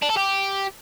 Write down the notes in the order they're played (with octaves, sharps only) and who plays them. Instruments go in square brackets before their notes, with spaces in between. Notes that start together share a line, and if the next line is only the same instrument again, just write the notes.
[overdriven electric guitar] D4
A4
G4